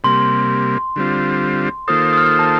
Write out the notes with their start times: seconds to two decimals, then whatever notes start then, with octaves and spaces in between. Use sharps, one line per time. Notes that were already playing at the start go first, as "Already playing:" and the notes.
0.04 C3 G3 A#3 C6
0.96 D3 G3 C4 F4
1.88 D#3 A#3 F4 A4 C5 D#6
2.13 D#6
2.17 F6
2.39 A5